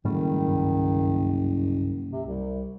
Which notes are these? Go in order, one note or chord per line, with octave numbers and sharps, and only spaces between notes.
F#1 G#2 D#3 G3 A3
C2 G2
C3
C2